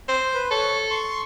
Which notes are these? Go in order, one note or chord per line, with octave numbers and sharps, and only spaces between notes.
C5
B4
A4 C#5
C6 C#6